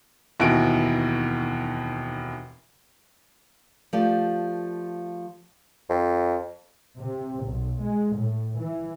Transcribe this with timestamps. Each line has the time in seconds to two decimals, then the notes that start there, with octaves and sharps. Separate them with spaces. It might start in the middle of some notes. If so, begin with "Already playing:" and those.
0.40 F1 D#2 B2 E3 F#4 D7
3.93 F3 A3 G4 D5
5.90 F2
6.98 C3
7.44 B1
7.82 G#3
8.15 A2
8.58 E3